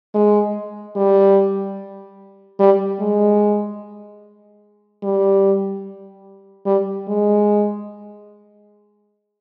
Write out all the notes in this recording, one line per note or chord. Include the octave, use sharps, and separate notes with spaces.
G#3
G3
G3
G#3
G3
G3
G#3